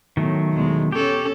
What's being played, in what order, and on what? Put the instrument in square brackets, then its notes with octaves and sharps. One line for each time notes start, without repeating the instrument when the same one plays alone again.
[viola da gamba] A2 B3 [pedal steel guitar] D#3 F#3 A3
[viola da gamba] E2 B2 G#3
[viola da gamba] C#4 A4 [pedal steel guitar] G4 C#5